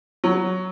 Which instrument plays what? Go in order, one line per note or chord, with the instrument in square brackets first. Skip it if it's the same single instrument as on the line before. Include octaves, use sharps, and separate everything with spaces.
[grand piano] F#3